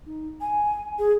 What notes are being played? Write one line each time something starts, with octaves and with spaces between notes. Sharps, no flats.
D#4
G#5
G#4